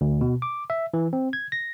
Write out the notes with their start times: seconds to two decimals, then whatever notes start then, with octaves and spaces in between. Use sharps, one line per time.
0.01 D2
0.21 B2
0.42 D6
0.70 E5
0.94 E3
1.13 C4
1.33 G#6
1.52 A#6